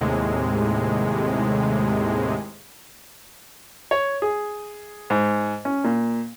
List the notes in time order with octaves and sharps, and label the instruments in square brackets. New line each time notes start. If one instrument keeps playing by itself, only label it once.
[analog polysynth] D#2 A2 C3 G#3
[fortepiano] C#5
G#4
G#2
C#4
A#2